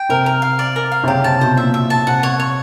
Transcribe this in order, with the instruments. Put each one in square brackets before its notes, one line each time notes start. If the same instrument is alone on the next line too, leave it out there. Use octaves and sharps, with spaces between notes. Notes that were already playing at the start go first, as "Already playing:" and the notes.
Already playing: [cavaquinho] G5
[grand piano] C3 [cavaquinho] A#4
[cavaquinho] A#4
F5
D5
A#4
F5
[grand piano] C3
[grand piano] C#3 [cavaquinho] G4
[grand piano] C3 [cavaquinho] A5
[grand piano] B2 [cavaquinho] C5
[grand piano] A#2 [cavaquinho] E5
[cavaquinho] E5
A5
[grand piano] C3 [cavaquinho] F#5
[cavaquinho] C#5
C#5